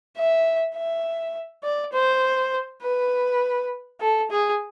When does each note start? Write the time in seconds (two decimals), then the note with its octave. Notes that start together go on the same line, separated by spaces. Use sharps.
0.17 E5
0.75 E5
1.63 D5
1.93 C5
2.82 B4
4.00 A4
4.30 G#4